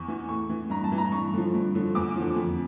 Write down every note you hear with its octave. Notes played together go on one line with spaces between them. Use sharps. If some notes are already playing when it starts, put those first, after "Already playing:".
Already playing: E2 C#6
E3
A2 C#6
E3
G2 A#5
A5
E3
A#5
G2 C#6
D3 F3
G2
D3 F3
E2 D6
D3 F3
F2